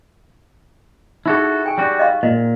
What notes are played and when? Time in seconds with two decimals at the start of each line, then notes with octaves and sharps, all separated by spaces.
1.26 D#4 E4 F#4 G#4 A4
1.66 G5 G#5
1.78 G3 F#4
1.99 D#5 F5 C6
2.23 A#2 D#5